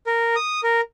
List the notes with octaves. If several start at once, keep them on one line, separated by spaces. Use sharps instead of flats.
A#4
D#6
A#4